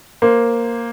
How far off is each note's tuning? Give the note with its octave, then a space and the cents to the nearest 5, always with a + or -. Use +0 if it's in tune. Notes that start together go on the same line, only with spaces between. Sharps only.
A#3 +0 C5 +0